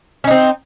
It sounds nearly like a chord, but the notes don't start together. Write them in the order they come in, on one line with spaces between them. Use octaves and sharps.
C#4 D#4 C4